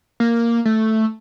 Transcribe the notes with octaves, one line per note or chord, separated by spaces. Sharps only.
A#3
A3